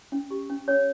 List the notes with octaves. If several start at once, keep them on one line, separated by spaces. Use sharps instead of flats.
C#4
G4
C#4
C#4 C#5